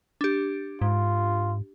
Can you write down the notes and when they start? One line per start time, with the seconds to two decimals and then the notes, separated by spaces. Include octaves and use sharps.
0.21 D4 G4
0.82 G#2 F4